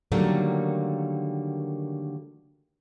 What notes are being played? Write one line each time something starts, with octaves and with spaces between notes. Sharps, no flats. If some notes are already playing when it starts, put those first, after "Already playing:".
D3 D#3 F#3 G3 A3 A#3